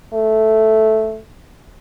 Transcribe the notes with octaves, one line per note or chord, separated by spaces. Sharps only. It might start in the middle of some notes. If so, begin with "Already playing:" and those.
A3